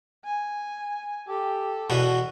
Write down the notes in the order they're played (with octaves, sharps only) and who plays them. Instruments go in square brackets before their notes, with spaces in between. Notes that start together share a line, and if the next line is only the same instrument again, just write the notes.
[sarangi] G#5
[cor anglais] G4 [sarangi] A4
[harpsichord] E2 B2 B3 [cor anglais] F#4